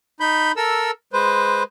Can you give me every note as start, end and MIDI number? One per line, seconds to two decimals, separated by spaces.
0.20 0.52 63
0.20 0.52 83
0.20 0.52 91
0.57 0.91 69
0.57 0.91 70
0.57 0.91 88
1.13 1.63 56
1.13 1.63 71
1.13 1.63 72